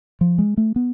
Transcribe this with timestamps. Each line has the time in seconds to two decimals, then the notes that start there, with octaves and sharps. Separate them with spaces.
0.21 F3
0.38 G#3
0.57 A3
0.76 B3